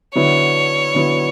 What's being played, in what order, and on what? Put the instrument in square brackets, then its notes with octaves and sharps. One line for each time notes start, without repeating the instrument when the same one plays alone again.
[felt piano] D3 F#3 B3 E4 [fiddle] C#5
[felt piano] D3 F#3 B3 E4